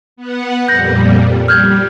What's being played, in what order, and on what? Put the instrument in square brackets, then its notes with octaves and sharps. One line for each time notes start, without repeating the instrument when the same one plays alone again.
[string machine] B3 F#5
[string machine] F2 A#2 G3 [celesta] G6 A#6
[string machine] G3 [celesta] F6 G6 G#6